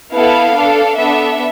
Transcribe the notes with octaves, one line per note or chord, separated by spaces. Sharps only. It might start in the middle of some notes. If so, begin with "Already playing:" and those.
B3 E4 A4 F5
D4 A4
B3 D4 A4 E5